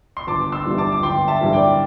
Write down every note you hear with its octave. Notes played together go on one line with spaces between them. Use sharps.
C6
G1 A5 D6
C6 E6
G2 E3 G3 E4
A5 D6
D6
G1 G5 C6
E5 A5
G2 E3 G3 E4
D5 G5